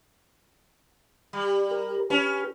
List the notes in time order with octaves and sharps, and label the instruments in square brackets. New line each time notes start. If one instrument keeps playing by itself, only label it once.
[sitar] G3
[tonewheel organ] A#4
[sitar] C#4 [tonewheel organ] G4 B4